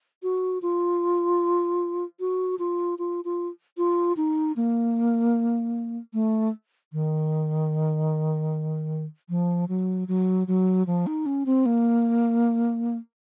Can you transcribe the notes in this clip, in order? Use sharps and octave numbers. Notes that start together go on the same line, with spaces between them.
F#4
F4
F#4
F4
F4
F4
F4
D#4
A#3
A3
D#3
F3
F#3
F#3
F#3
F3
D#4
C#4
C4
A#3